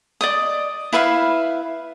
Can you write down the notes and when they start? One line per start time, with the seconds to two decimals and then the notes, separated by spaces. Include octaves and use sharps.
0.21 D5 D#5 D#6
0.93 E4 B4 E5 F5